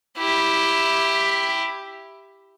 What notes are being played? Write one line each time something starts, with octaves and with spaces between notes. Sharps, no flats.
E4 G4